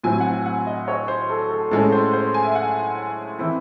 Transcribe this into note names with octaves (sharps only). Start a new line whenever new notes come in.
A2 F#3 C4 G#5
F#5
G#5
F#5
D#5
C#5
C5
A4
A4
A2 G#3 C#4 A4
C5
C5
G#5
E5
F#5
E3 C4 E4